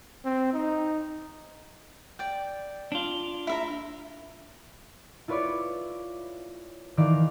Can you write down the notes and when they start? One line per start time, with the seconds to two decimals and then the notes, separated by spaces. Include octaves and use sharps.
0.25 C4
0.53 D#4
2.19 D5 G5
2.92 D4 F4
3.47 E4 E5 A#5
5.28 E4 F4 B4 C#5 D5
6.97 D#3 E3 D5 F5